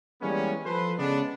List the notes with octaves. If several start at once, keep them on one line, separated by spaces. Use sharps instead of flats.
E3 G3 G#3 A#3 B3 C#4
F3 A4 B4 C5
C#3 G#3 B3 D4